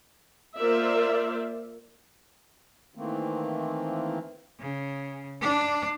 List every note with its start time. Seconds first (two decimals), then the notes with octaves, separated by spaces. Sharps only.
0.58 A#3 F4 A#4 C5 D5 E5
2.95 D#3 E3 A3 A#3 C4
4.60 C#3
5.41 D4